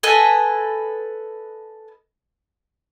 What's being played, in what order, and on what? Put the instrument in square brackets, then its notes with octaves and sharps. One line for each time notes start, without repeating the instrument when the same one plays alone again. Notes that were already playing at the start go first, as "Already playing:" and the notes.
[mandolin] A4 B4 D#5 G#5